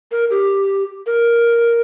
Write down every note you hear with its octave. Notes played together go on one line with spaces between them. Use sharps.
A#4
G4
A#4